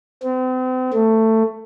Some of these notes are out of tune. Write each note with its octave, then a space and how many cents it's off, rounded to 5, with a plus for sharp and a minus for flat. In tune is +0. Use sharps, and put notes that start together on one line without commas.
C4 -40
A3 +15